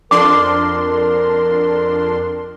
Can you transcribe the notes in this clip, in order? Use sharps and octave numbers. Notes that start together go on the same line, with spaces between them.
F2 D4 A#4 C6 D6